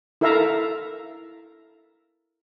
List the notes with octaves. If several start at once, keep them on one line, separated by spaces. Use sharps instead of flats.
E4 A4 A#4 E5 F5 A#5